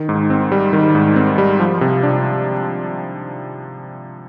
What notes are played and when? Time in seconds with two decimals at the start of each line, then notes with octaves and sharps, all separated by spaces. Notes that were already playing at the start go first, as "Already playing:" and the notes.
Already playing: D#3
0.09 G#2
0.30 C4
0.52 G3
0.73 D#3
0.95 G#2
1.16 C4
1.38 G3
1.60 F3
1.81 C3
2.03 D4